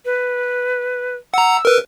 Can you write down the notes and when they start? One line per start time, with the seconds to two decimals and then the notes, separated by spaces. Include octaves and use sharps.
0.05 B4
1.34 F#5 A#5 E6
1.65 A#4 B4